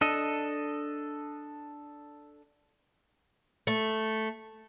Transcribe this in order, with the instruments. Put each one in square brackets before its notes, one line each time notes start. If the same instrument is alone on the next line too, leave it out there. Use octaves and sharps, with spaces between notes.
[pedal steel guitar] D4 A4 D#5
[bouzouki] A3